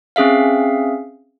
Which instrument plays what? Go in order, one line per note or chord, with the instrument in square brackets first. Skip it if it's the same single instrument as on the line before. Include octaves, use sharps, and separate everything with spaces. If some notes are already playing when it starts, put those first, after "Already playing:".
[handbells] C4 C#4 G#4 E5 F5